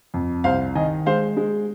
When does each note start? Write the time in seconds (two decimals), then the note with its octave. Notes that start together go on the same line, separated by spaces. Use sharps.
0.14 F2
0.44 C2 C5 F5
0.75 D#3 D#5 G#5
1.06 G#3 C5 F5
1.37 G#3